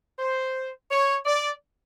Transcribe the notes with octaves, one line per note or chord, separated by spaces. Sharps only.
C5
C#5
D5